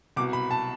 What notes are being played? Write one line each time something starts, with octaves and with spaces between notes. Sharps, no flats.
C2 B2 D6
B5
A5